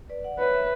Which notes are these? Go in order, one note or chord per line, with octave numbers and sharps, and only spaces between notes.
B4 D5
D5 F#5
B4 C#5 E5
E5